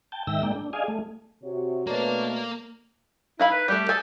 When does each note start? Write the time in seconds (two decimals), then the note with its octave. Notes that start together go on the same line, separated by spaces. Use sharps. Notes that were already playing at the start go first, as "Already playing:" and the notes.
0.12 G5 A5
0.27 G#2 D#3 E5 G5 E6 A#6
0.43 G#3 A#3 D5 G5
0.55 D4
0.73 G#4 D5 D#5 F5 G#5
0.88 A3
1.42 C3 F#4 C#5
1.87 B2 A3 A#3 D4 A#4 C#5
3.40 D#4 E4 F5 B5
3.51 B4
3.68 G3 A3 G4
3.89 G#4 A4 G#5